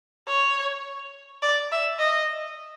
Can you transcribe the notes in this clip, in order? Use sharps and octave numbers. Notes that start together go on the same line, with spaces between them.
C#5
D5
E5
D#5